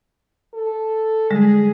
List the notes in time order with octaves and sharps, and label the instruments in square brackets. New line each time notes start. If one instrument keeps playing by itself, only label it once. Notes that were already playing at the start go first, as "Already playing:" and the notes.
[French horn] A4
[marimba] D3 G3 G#3 [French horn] G#4